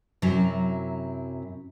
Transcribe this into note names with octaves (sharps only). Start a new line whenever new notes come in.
F#2 C3 F#3 E4 A#5